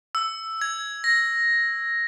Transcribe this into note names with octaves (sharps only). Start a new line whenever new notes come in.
E6
G#6
A#6